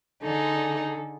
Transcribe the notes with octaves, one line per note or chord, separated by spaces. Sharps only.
D3 D#4 G#4 A4